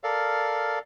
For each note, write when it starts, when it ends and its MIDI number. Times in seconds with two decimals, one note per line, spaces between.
0.04 0.79 69
0.04 0.79 70
0.04 0.79 74
0.04 0.79 77